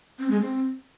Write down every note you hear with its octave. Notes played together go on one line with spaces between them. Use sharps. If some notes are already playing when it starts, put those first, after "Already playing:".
C4
G#3
C4